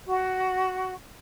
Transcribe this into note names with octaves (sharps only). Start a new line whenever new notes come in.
F#4